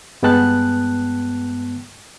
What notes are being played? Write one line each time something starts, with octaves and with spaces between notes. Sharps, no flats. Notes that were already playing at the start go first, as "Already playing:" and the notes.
G2 G#3 B3 G5 A5 F#6